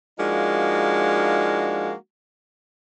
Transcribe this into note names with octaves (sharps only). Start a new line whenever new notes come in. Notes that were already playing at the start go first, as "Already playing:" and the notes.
F3 G#3 A#3 D4 D#4 F#4